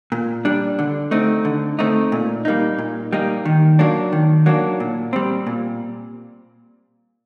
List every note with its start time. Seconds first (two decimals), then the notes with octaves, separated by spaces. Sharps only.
0.12 A#2
0.45 G3 D4
0.79 D3
1.11 A3 C4 D#4
1.45 D3
1.79 A3 C4 D#4
2.12 A#2
2.45 G3 A#3 D#4
2.78 A#2
3.12 G3 A#3 D#4
3.45 D#3
3.79 F#3 A#3 D4
4.12 D#3
4.46 F#3 A#3 D4
4.80 A#2
5.13 G3 C4
5.47 A#2